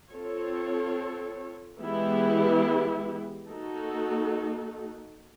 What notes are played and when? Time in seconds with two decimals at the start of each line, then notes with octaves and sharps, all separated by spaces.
0.12 C4 F4 A4 C#5
1.81 E3 G#3 B3 E4 G4
3.50 A#3 D#4 F#4 A4